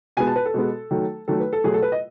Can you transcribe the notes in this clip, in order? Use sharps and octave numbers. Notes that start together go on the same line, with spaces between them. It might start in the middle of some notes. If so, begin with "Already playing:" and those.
B2 G#3 B3 G#5
A5
B4
A4
B2 G#3 B3
D#3 F#3 A3
D#3 F#3 A3 A4
B4
A4
B2 F#3 A3 G#4
A4
B4
D#5